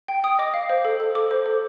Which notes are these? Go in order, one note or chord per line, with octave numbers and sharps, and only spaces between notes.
G5
G5 D#6
D#5 D6
F5
C5
A4
A4
A4 D6
C5
A4